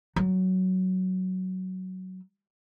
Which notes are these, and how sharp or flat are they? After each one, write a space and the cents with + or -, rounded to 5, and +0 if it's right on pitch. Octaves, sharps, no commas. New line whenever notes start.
F#3 +10